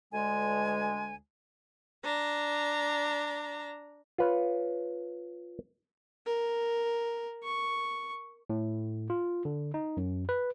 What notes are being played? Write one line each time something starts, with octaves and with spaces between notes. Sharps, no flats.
D2 D3 G#3 G#5
D4 A#5
F4 B4 C#5
A#4
C#6
A2
F4
D3
D#4
F#2
B4